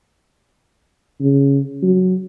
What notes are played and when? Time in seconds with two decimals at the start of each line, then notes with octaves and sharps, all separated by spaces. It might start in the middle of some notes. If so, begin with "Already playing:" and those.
1.21 C#3
1.83 F#3